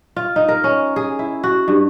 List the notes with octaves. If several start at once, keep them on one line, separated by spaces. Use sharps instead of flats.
F4
D#4
A#4
C#4
G#4
E4
F#4
G2